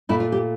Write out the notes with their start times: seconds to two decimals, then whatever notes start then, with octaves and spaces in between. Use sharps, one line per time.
0.09 A#2 A3 E4
0.20 F4
0.32 G4